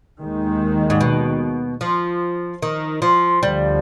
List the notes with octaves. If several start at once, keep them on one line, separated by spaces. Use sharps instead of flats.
D#2 D#3 G#3
G#2
B2
F3
D#3
F3
D2 D3 F3 G3